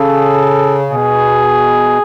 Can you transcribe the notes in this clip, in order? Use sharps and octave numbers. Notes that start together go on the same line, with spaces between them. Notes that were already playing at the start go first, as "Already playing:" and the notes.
Already playing: C#3 A4
B2 G#4